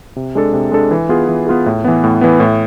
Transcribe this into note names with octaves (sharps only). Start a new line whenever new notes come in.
C3
G#3 D4 A4
C3
G#3 D4 A4
E3
B3 F4 G#4
E3
B3 F4 G#4
A2
E3 B3
A2
E3 B3
A2